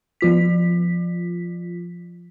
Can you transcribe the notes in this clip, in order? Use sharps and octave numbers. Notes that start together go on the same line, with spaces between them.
F3 F4 B6